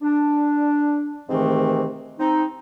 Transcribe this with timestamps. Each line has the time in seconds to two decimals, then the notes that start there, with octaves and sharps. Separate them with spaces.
0.01 D4
1.29 G#2 C3 D#3 E3 A3 C4
2.20 C4 D#4